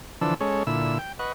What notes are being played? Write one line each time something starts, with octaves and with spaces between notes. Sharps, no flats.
D3 E3 F3 D4 A4 E6
G#3 C#4 A4 C#5
A#2 D3 E4 E6
G5
B4 D#5 F#5 C#6